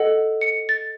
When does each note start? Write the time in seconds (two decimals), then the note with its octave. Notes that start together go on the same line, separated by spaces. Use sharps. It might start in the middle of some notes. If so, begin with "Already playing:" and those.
Already playing: A4 D#5 F#5
0.41 C#7
0.69 A6